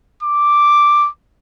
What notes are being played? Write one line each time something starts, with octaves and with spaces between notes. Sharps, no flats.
D6